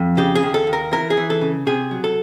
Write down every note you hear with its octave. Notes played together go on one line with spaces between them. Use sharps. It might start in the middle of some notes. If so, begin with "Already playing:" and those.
Already playing: F2
C#3 G4
G#4
D#2
A4
D#2
A#4
E3 A#4
G#4
E3
A4
C#3
C3 G#4
F#3
A4